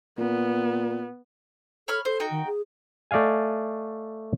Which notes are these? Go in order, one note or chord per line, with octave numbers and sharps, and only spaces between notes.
A#2 B3
A4 C#5 B5 F6
A4 C5
D#4 F#4 G5
D#3
G#4
A3 D5 D#5 F5 G#5